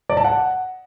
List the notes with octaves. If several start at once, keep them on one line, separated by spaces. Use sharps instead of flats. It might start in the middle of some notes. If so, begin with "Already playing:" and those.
D5
A5
F#5